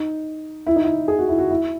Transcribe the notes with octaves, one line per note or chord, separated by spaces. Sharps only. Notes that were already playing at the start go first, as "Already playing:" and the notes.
Already playing: D#4
E4
D#4
E4
G#4
F#4
E4
F#4
E4